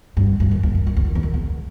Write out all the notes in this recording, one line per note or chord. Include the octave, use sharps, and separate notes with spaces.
G2
G2
F#2
E2
F#2
F#2
E2
F#2
E2
F#2
E2